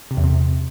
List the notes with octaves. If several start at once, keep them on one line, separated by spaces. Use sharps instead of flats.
C3
E2
C3